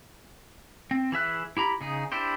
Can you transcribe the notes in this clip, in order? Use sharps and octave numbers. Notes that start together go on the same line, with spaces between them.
C4
E3 G#4 E5 F#6
E4 G4 A#5 B5
C#3 D#4 G#4
D4 E4 G4 C5